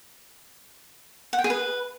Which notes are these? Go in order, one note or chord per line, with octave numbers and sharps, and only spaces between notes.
F#5
G5
G#4
B4